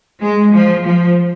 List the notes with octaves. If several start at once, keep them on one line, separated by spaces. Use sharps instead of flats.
G#3
F3
F3